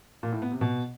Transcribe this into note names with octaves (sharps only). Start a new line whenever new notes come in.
A#2
A2
B3
C3
B2